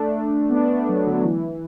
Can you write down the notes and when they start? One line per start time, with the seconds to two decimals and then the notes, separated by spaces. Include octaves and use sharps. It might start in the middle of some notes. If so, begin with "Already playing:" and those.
Already playing: A3 D4
0.50 B3
0.56 A3 D4
0.72 A3 D4
0.89 F#3 B3
1.06 D3 F#3
1.23 E3